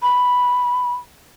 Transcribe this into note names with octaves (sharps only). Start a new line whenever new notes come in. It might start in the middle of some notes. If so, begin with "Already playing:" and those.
B5